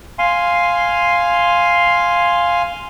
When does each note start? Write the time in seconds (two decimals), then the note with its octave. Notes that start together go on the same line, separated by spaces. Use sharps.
0.19 F5 G#5 C6